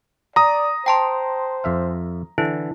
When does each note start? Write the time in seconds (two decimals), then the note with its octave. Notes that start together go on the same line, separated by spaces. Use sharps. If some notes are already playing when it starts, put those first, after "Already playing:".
0.36 D5 A#5 D#6
0.86 C5 G5 A5 C6
1.64 F2 E5 F5
2.38 D3 E3 E4 A4